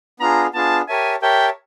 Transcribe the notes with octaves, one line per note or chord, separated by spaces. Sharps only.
B3 D4 F4 G#4 A#5
B3 D4 F4 G#4 A5
G4 A#4 C#5 E5 G#5 A5
G4 A#4 C#5 E5 G5 A5